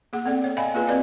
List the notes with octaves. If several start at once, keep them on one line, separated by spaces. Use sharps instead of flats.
A#3 G#4 F#5
B3 C4 A4 D5 G5
C#5
C#5 D#5 F5 G5 G#5 B5
A#3 F4 G#4 B4 G#5
C4 F#4 B4 D5 D#5 F5